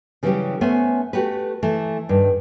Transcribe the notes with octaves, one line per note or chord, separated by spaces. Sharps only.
C#3 E3 F#3 G3 C#4 G4
A3 B3 C#4 C5 C#5 G#5
A3 F#4 G4 B4
E3 A3
G2 D#3